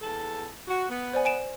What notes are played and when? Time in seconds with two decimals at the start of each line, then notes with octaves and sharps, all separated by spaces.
0.01 E2 A4
0.68 F#4
0.89 B3
1.13 C5 D5 G#5
1.25 G#5 D7 E7